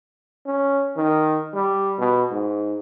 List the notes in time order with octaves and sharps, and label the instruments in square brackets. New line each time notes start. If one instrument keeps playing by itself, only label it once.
[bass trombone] C#4
D#3
G3
B2
G#2